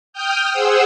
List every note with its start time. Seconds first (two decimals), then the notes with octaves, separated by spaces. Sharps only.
0.13 G5 D#6 F6 G6
0.51 G#4 C5 F#5 E6